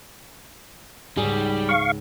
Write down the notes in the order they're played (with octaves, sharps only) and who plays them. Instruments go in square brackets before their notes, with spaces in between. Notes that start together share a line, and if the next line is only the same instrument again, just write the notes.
[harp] C#2 G#2 [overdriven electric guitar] G3 [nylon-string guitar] G#4
[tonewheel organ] F5 C#6